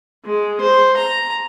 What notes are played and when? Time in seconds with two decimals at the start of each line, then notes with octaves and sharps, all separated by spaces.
0.25 G#3
0.61 C5
0.97 A#5